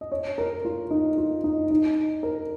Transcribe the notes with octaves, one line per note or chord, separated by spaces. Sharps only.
D#5
C#5
A#4
F4
D#4
F4
D#4
D#4
A#4